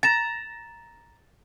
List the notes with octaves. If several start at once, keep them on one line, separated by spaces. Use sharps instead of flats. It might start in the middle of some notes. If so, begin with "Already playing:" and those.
A#5 A6 E7